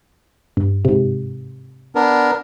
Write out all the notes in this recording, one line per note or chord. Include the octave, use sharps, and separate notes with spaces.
G2
G#2 C3
B3 D4 A#4